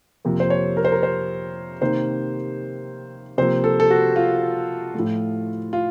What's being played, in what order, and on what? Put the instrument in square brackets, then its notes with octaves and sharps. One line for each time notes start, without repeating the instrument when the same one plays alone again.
[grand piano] F2 C3 F3 A#3
C5
C#5
A#4
C5
A#4
C5
C3 D#3 A#3 C5
C3 F3 A#3 C5
A4
A4
F#4
F4
A2 F3 A3
F4